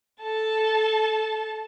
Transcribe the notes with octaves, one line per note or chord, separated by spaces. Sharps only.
A4 A5